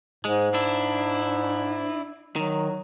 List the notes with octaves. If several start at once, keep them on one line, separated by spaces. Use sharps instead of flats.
G#2 G#3
D4 E4
D#3 F#3